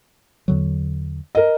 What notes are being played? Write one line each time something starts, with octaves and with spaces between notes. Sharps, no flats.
E2 D3 F#3
A#4 D#5